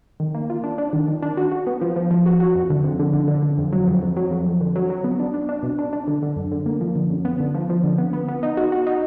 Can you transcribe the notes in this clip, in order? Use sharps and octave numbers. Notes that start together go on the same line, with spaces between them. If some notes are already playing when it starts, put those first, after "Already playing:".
D#3
A#3
F4
D4
D4
D#3
D#3
D4
F#4
F#4
B3
F3
F3
F3
F#4
F#4
F2
D3
F2
D3
D3
D3
D3
F2
F#3
F2
F2
F#3
F2
F2
D3
F#3
F#3
B3
D4
D4
D4
B2
D4
D4
D3
D3
F#2
D3
A#3
F3
D3
F#2
B3
D3
F3
F3
D3
B3
B3
B3
D#4
F#4
F#4
D#4